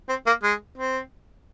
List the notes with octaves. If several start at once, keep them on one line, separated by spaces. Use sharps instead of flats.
C4
A#3
G#3
C4